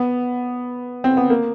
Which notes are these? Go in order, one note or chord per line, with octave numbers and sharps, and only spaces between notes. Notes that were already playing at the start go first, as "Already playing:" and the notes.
Already playing: B3
C4
B3
A#3